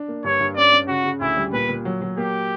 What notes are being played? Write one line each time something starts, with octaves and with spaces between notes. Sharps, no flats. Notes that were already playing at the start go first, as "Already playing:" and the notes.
Already playing: D4
A#3
G2 C#5
G2
C#4 D5
C#4
C#3 F#4
C#3
D2 E4
G3
A#2 B4
A#2
F#3
F#3
A#3 G4